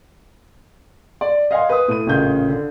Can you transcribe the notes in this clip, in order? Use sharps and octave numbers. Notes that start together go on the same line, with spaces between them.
D5
D#5 F5 F#5 G#5 C6
B4 D#6
A2 D#7
A1 A#2 C#3 G6
D3